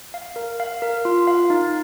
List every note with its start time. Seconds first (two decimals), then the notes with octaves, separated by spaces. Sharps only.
0.14 F5
0.36 A#4
0.60 F5
0.82 A#4
1.05 F4
1.27 F5
1.50 D#4